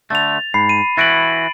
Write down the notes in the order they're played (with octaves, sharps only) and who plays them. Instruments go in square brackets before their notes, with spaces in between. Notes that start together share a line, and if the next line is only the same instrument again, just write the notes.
[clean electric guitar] D3 A3 [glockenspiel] A6 F7
[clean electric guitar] G#2 [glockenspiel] B5 C7
[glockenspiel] D#7
[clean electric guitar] E3 E4 F#4 [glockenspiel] A6 D7 F#7